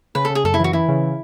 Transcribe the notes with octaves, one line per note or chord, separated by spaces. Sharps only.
C#3 B4
A4
C#3
G#4
F#2 A4
E4
E3 F#4
E3 E4
C#3